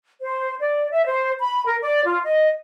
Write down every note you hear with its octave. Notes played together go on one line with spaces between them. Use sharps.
C5
D5
E5
C5
B5
A#4
D5
F4
D#5